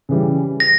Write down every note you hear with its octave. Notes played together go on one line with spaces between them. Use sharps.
C#3 E3 G3
A#6